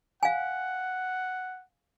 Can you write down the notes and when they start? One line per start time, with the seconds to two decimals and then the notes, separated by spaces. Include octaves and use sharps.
0.23 F5 F#5 G#5